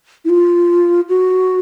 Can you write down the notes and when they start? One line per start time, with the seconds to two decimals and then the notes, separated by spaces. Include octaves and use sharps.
0.25 E4
0.29 F4
1.09 F#4